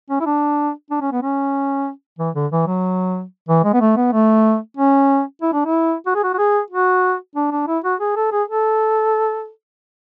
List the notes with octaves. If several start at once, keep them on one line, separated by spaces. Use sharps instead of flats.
C#4
E4
D4
D4
C#4
B3
C#4
E3
D3
E3
F#3
E3
G#3
B3
A3
B3
A3
C#4
E4
D4
E4
F#4
G#4
F#4
F#4
G#4
F#4
D4
D4
E4
F#4
G#4
A4
G#4
A4